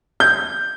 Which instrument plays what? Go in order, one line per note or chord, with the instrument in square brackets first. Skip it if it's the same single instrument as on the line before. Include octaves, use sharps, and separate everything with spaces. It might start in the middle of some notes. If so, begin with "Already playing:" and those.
[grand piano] G6